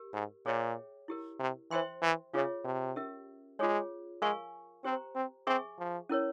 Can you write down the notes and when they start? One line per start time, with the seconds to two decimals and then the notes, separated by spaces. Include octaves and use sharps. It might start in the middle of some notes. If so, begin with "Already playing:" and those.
Already playing: G4 A#4
0.14 G#2
0.45 A#2 G#4 C#5 E5 G5
1.08 E4 G4 A#4
1.40 C3
1.71 E3 C5 E5 G5 C6
2.02 E3
2.34 C#3 F4 G#4 C#5 E5
2.65 C3
2.96 C#4 G4 A#4 E5
3.59 G#3 F4 G#4 C#5
4.22 G#3 A#4 F5 G#5 C#6
4.85 C4 G4 C5 G5 A#5
5.15 C4
5.47 C4 G#4 E5 G#5 C#6
5.79 F3
6.09 C#4 E4 A#4 C#5